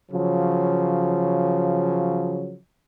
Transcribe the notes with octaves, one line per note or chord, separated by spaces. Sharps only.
C#3 F3 F#3